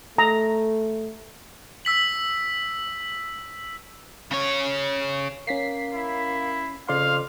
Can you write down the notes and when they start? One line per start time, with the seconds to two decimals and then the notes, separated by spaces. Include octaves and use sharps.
0.18 A3 A#5
1.85 E6 B6 F#7
4.31 C#3 C#5
5.47 A#3 C#4 B6 C7
5.94 E4
6.89 F2 C#3 D5 F5 C6